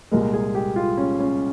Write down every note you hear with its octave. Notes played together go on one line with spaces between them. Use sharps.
C2 A#2 G#3 A#4
G#4
G4
F4
C#4
C#4